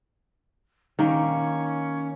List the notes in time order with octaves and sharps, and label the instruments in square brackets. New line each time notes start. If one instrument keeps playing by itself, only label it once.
[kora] D#3 A#3 [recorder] C#4